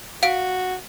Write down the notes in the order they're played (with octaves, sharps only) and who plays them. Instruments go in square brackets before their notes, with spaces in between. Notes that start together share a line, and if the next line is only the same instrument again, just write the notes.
[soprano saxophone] F#4 [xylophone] F5 D7